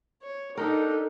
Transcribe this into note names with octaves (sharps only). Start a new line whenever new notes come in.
C#5
D4 D#4 G4 A4 A#4